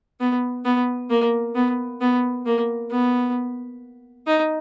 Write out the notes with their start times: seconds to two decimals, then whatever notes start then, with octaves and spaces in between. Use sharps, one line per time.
0.20 B3
0.65 B3
1.10 A#3
1.55 B3
2.01 B3
2.46 A#3
2.91 B3
4.27 D#4